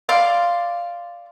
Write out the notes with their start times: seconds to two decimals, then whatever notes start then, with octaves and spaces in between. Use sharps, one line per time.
0.09 D5 F5 C6 D6